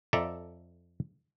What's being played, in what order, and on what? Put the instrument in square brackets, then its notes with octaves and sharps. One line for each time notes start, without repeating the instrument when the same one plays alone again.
[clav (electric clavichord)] F2 A4 D5 E5 A#5